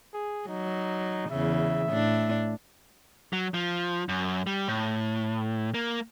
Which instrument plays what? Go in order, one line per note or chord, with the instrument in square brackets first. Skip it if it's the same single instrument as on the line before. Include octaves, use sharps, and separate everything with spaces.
[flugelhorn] G#4
[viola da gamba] F#3 [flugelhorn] D#4
[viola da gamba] E2 C#3 [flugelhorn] E5
[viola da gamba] A2 D4
[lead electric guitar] F#3
F3
F#2
G3
A2
A#3